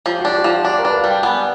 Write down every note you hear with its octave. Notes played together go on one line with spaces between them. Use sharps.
F3 G4
F#4
D4 G4
G4
F3 F#4
D4 F#4
A#4
D4 B4
F5
G3
G5
B3 G#5